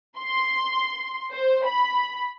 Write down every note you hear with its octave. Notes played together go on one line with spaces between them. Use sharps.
C6
C5
B5